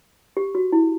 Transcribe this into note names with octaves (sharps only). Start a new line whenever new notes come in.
G4
F#4
E4